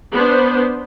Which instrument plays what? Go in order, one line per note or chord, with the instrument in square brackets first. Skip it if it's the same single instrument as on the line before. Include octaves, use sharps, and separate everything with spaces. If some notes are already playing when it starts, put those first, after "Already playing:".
[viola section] B3 D4 C5